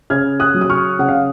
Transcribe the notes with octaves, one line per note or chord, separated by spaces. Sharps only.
C#3 F6 G#6
D#6 F#6
F#3
D#6
C#6 F6
C#3 F#5
F5